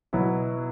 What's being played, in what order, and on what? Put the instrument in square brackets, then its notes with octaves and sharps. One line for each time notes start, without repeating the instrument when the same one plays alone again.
[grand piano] B2 F#3 B3 E4